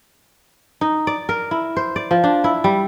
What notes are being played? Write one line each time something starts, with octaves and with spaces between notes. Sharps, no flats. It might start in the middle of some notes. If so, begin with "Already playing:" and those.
D#4
D5
A#4
E4
C5
D5
F3
D4
E4
G3